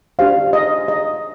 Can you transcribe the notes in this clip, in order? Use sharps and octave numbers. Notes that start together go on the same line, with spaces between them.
D4 G4 C5 F5
D#5
D#5